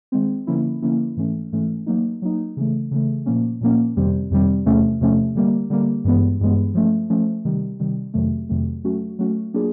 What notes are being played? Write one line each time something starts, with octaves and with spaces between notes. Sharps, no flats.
D#3 G#3 C4
D3 F3 A#3 C#4 E4
D3 F3 A#3 C#4 E4
G#2 E3 A3 C#4
G#2 E3 A3 C#4
F#3 A#3 D#4
F#3 A#3 D#4
C#3 E3 A3
C#3 E3 A3
A#2 F3 A#3 C#4
A#2 F3 A#3 C#4
F2 C3 D#3 G3 C4
F2 C3 D#3 G3 C4
E2 C3 F3 A3 C#4
E2 C3 F3 A3 C#4
D3 G3 A#3
D3 G3 A#3
G2 E3 G#3 B3
G2 E3 G#3 B3
F3 A3 C#4
F3 A3 C#4
C3 D#3 G3
C3 D#3 G3
F2 C3 D#3 F#3 A3
F2 C3 D#3 F#3 A3
F#3 A3 C#4 F#4
F#3 A3 C#4 F#4
F#3 A#3 D4 F4 G#4